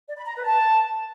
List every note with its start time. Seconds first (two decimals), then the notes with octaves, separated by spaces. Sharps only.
0.07 D5
0.16 B5
0.25 A#5
0.34 B4
0.43 A5